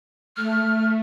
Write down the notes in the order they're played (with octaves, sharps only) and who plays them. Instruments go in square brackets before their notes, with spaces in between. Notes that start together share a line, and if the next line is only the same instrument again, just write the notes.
[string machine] A3 [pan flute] F6